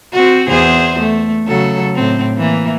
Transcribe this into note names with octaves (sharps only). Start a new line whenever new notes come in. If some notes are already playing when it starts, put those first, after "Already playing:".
C4 F#4
E2 G#4 C5
A3
C#3 F#3 A4
A2 C4
E3 A#3